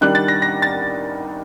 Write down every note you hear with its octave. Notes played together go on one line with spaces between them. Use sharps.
D#3 G3 D4 F#6
A6
A#6
A#6
A6